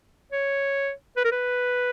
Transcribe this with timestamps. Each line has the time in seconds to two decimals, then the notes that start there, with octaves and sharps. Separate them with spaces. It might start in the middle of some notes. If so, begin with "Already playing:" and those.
0.32 C#5
1.17 B4
1.25 A#4
1.32 B4